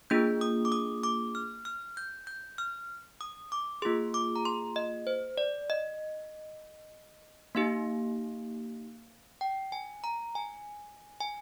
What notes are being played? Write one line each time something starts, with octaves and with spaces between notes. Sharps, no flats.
A#3 D4 F4 G#4 G6
D#6
D6
D#6
D6
F6
F6
G6
G6
F6
D#6
D6
A#3 F4 G#4 C6
D6
A#5
C6
D#5
C5
D5
D#5
A#3 D#4 G4 F5
G5
G#5
A#5
G#5
G#5